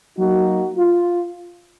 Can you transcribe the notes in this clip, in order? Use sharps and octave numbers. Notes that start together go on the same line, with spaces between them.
F#3 A#3 D#4 F#4
F4